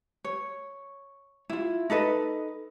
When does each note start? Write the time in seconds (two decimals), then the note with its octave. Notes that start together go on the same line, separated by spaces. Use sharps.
0.24 C#5
1.50 E4 F4
1.90 D#4 A4 B4 D#5